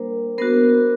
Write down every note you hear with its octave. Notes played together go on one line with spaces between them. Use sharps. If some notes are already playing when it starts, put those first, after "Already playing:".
Already playing: G3 A#3 D4 A#4 C5
B3 D4 F#4 A#4 C5